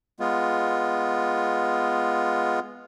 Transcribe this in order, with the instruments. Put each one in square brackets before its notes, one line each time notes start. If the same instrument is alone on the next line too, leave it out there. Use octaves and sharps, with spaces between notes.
[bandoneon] G#3 B3 F4